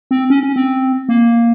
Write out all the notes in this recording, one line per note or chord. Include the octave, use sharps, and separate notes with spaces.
C4
C#4
C#4
C4
A#3